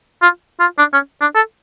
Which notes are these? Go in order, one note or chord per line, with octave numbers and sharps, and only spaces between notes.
F4
F4
D4
C#4
D4
A4